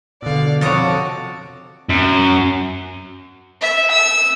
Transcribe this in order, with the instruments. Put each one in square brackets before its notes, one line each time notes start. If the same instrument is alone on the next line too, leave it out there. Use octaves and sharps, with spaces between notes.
[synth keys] B2 D3 [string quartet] D5 F5
[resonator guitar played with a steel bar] F2 C#5 [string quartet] C3 F#4 A4 [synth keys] A5 D6 D#6
[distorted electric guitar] F#2
[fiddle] E5
E6